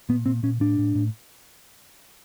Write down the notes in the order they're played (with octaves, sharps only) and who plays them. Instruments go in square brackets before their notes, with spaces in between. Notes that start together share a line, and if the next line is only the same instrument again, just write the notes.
[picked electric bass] A#2 B3
A#2 C4
A#2 C#4
A2 D4
A2
A2